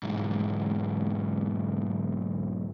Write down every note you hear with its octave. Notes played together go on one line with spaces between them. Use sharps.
B1 G#2